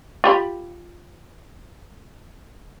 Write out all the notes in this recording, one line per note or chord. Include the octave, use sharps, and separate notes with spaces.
F4 G4 B5